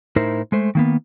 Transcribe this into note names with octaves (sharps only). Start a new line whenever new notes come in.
A2 D#4 E4 A#4 C5
G#3 A3 C5
D#3 A#3 B3